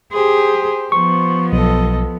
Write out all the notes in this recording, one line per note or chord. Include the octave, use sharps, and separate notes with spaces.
G4 G#4 C5
F3 B3 C5 C#6
B1 A4 D#5